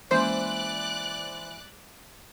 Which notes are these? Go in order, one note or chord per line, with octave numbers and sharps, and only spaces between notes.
E3 G#3 A#3 C#4 C5 D5 F#6